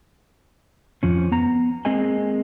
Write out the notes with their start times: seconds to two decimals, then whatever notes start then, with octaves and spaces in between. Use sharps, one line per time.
1.03 F2 F3 C#4
1.32 B3 A#5
1.85 G#3 A#3 C4 G#4 D#5 G#5